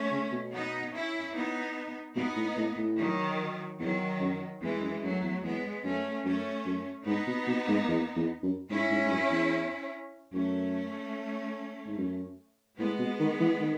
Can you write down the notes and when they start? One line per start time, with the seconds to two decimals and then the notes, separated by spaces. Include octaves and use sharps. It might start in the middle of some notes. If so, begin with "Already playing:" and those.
Already playing: A3 C#4
0.11 C#3
0.32 B2
0.53 B3 D#4
0.93 C#4 E4
1.34 B3 D#4
2.16 B2 B3 D#4
2.36 A2
2.57 A2
2.77 A2
2.97 D#3 F#3
3.80 E2 D#3 F#3
4.21 F#2
4.61 E2 E3 G#3
4.82 F#2
5.02 F#2 F#3 A3
5.23 E2
5.43 E2 G#3 B3
5.84 F#2 A3 C#4
6.25 F#2 A3 C#4
6.66 F#2
7.06 G#2 B3 D#4
7.27 B2
7.47 B2
7.68 G#2
7.88 E2
8.16 E2
8.43 F#2
8.70 G#2 C#4 E4
8.91 G#2
9.06 G#2
9.11 F#2
9.31 E2
10.33 F#2 A3 C#4
11.87 G#2
11.98 F#2
12.79 A2 G#3 B3
12.99 B2
13.19 D#3
13.40 E3
13.60 D#3